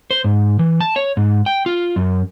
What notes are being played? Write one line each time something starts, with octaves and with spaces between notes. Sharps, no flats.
C5
G#2
E3
A5
C#5
G#2
G5
F4
F#2